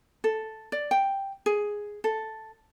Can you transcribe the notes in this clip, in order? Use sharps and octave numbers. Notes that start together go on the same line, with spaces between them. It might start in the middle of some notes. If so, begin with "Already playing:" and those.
A4
D5
G5
G#4
A4